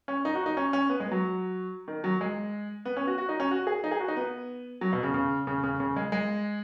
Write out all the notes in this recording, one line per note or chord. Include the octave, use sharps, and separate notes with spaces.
C#4
D#4
F#4
D#4
C#4
C#4
B3
G#3
F#3
D#3
F#3
G#3
B3
C#4
F#4
F#4
D#4
C#4
F#4
G#4
D#4
G#4
F#4
D#4
B3
F#3
B2
C#3
C#3
C#3
C#3
C#3
G#3
G#3